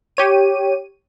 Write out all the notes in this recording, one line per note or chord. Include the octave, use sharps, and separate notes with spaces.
G4 C#5 D#7